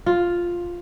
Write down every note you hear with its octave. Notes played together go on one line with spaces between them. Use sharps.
F4